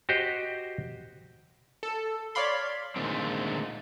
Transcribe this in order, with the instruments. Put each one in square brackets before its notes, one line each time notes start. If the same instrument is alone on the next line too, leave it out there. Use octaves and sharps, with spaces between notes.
[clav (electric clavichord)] F#4 G4 C5 D#5
[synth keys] A4
C#5 D5 F5 B5 C6
[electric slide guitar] A#2 D3 D#3 G#3 A3 C4